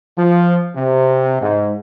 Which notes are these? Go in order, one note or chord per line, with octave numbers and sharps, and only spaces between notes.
F3
C3
G#2